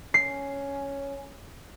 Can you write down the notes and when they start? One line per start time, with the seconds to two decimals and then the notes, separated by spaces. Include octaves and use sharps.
0.14 C#4 C7